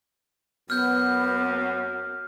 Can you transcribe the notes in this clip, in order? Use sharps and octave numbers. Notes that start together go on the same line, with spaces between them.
F#2 B3 F6 G6